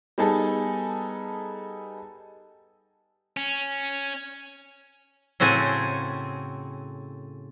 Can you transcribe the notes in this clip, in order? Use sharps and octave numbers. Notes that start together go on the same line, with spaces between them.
G3 B3 D#4 G#4 A4
C#4
A2 C#3 C4 F#4 A4 G#5